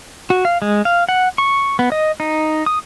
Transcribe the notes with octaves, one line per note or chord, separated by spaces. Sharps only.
F#4
F5
G#3
F5
F#5
C#6
B3
D#5
D#4
D#6